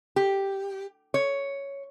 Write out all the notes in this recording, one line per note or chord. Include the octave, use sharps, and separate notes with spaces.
G4
C#5